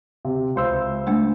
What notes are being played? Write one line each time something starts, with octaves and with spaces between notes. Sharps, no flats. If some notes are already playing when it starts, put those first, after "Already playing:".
C3
C#2 C5 E6
G#3 A3 D4